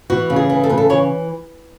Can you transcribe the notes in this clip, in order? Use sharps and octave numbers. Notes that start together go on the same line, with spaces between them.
E3 F#4
C#3
G#4
E3
A4
C#3 B4
A4
E3 C#5